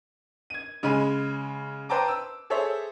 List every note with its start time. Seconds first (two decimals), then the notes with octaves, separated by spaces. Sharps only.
0.50 G#6 D#7
0.83 C#3 G#3 G#5 B5 D#7
1.89 B4 C5 G5 A5 A#5 D6
2.08 E6
2.50 G#4 A4 C5 C#5 E5